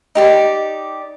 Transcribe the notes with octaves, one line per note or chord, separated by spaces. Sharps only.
D#4 G4 D5